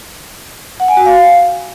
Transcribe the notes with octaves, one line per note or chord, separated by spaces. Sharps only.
F#5
G#5
F#4
F5